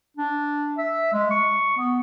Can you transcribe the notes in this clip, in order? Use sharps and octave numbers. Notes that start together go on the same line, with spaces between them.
D4
E5
G#3
C#6
B3